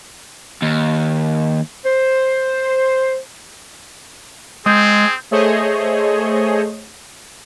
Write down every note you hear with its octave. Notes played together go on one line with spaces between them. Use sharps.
D#2
C5
G#3 C4 G#4 D#6 G6
A3 G#4 C5 C#5 D#5